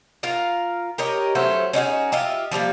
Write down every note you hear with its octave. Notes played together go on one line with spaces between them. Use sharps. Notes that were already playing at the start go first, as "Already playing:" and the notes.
F4 A#4 F5
G4 A#4 C#5 D#5
F#3 A3 C#4 C5
C#4 D#4 F#4 G#4
F4 G4 D#5 E5
F3 G3 G#3 A#3